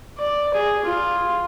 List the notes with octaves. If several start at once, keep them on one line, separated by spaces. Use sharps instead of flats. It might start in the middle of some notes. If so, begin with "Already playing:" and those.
D5
G#4
F4